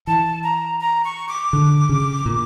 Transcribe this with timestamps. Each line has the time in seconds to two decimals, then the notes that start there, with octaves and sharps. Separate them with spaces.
0.07 E3 A5
0.43 A#5
0.80 A#5
1.05 C#6
1.29 D6
1.53 D3
1.89 C#3
2.26 A#2